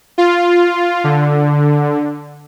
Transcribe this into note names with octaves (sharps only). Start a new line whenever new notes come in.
F4
D3